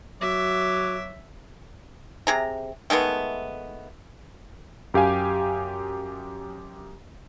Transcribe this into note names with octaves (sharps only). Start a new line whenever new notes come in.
F#3 F#4 E5 D6
C3 G#4 A#5
D#3 G#3 A3 B3
F#2 G4 F5 G#5